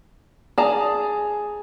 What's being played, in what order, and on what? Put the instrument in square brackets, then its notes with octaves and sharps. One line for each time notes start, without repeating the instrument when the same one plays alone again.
[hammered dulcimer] G#4 [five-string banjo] D5 A5 A#5